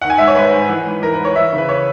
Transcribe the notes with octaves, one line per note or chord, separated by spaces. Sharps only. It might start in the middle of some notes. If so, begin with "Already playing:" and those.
D#3 F#5
G#5
G#2 E5
C#5
G#2 B4
G#2
E3
G#2
E3 A#4
B4
G#2
C#5
E3 E5
C#3
B4
C#5